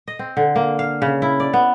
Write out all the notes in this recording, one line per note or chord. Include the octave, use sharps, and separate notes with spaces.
D#5
C4
D3
A#3
F5
C#3
E4
D5
B3